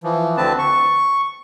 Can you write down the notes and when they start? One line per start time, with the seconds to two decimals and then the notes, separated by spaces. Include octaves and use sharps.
0.04 E3 F3
0.37 D2 D3 C4 B4 A5
0.59 C#6